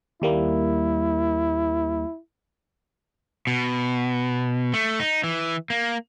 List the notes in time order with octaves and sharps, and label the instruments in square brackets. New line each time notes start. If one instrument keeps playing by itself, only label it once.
[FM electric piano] D#2 G3 A#3 [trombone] E4
[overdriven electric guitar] B2
A3
D#4
E3
A#3